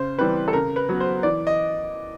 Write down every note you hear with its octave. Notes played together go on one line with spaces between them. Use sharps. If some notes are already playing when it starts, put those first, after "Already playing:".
Already playing: C#3 C5
E3 G3 C4 B4
A4
C#3 A#4
B4
F#3 B3
C5
E3 D5
D#5